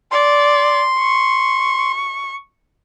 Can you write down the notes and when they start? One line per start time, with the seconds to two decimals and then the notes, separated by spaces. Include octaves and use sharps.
0.12 D5 C6
0.99 C#6